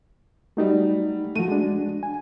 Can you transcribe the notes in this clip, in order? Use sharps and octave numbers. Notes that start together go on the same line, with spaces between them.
F#3 G3 A3 D#4
F3 A3 F#4 D#7
G#3 D4
G#5